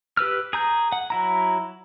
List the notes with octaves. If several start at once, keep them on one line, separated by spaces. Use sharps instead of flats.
G4 B4 E6 F6
G#4 A#5 G6
F#5
F#3 E4 A#5